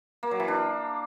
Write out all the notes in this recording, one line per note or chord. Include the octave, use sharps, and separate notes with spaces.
A#3
F#3
E3
D4